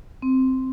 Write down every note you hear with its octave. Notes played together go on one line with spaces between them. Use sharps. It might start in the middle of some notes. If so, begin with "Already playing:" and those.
C4